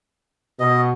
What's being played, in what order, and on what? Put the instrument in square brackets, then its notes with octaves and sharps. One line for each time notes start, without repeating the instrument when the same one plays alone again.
[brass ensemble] B2 [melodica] D#5